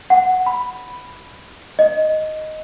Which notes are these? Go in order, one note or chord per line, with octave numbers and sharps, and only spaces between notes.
F#5
B5
D#5